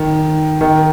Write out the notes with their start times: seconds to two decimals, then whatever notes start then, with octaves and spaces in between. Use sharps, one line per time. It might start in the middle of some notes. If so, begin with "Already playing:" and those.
Already playing: D#3
0.61 D#3